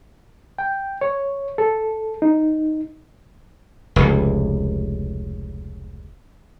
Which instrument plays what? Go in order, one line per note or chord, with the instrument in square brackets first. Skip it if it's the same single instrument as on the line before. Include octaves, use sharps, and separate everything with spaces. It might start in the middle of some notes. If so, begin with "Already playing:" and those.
[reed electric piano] G5
C#5
A4
D#4
[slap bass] F1 C#2